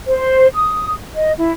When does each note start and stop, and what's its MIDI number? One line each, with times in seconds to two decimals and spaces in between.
0.07 0.47 72
0.54 0.93 87
1.14 1.32 75
1.38 1.52 64